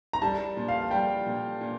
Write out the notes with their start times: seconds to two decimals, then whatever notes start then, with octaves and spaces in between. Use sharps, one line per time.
0.13 A#5
0.22 G3 A5
0.57 A#2
0.68 F5
0.91 G3 G5
1.26 A#2
1.61 A#2